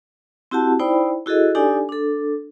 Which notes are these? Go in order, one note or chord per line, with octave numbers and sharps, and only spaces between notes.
C4 E4 F#4 G4 F#5 A5
D#4 E4 C5 D5 G5 B5
E4 F#4 G#4 A4 D#5
D4 D#4 G4 A4 D5 G#5
D4 A4